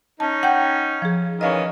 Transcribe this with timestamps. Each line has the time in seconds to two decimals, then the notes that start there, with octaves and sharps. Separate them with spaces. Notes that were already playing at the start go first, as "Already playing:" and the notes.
0.20 C#4 D#4 A5
0.43 F#5 G5 G6
1.02 F3 G#4
1.41 D#3 E3 C#4 D#5 F5